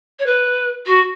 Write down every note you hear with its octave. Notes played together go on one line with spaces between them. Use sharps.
C#5
B4
F#4